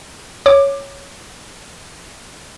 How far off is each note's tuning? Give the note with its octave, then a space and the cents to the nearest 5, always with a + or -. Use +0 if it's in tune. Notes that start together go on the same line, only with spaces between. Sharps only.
C#5 +0 D6 +15